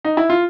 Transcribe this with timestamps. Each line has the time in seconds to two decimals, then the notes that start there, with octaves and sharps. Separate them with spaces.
0.05 D#4
0.17 E4
0.30 F4